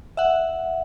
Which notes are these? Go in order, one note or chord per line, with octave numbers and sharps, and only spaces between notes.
E5 F#5